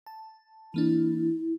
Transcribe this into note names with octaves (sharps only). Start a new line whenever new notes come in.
A5
E3 A#3 D4 E4